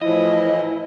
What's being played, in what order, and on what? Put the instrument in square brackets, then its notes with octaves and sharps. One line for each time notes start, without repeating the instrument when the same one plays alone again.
[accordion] A2 E3 F3 [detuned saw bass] E4 [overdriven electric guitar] D#5